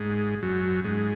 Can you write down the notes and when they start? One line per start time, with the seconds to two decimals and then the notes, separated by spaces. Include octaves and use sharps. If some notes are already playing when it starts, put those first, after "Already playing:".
Already playing: G#2
0.43 F#2
0.84 G#2